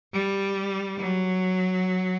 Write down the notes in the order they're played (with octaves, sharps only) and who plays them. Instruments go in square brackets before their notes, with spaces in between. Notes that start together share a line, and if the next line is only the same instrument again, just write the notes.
[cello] G3
F#3